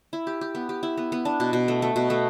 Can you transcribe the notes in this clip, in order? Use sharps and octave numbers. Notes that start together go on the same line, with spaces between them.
E4
G4
G4
B3
G4
E4
B3
B3
D4
B2
B2
A3
A3
B2
A3